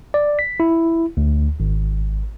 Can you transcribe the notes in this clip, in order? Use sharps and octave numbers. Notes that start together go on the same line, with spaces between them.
D5
B6
E4
D2
G#1